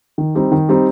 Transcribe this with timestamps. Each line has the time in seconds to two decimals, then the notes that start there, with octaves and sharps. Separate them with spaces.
0.18 D#3
0.35 G3 C4 D#4
0.52 D#3
0.69 G3 C4 D#4